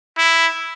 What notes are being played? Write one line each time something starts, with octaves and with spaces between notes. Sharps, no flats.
E4